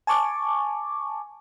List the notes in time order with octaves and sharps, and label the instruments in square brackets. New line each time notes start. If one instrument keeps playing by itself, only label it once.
[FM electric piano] G#5 A5 C#6 D6